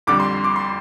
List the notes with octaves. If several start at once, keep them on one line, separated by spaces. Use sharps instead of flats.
F2 D3 G3 D6
C6
D6
C6